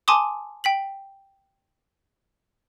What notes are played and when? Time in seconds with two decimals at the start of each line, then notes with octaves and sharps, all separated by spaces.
0.08 G#5 A5 C6 D6 D#6
0.64 G5 B6 F#7